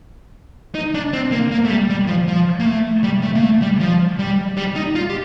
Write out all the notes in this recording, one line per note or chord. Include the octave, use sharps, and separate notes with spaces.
D#4
D4
C4
A#3
A#3
A3
G3
G3
F3
F3
A#3
A3
G3
A3
A#3
A3
G3
F3
G3
G3
D#4
F4
G4